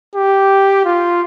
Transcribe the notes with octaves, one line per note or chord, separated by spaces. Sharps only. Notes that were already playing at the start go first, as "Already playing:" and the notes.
G4
F4